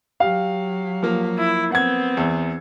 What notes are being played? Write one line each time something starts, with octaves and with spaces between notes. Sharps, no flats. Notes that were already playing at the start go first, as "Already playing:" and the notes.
F#3 G4 F5
F3 A#3
E4
B3 C4 F#5 G#6
E2